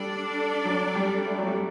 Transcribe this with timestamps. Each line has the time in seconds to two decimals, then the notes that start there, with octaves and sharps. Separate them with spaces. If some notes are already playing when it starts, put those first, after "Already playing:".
Already playing: G3 D4 A4 D5
0.65 F#3
0.96 G3
1.26 A3
1.39 F#3
1.47 G3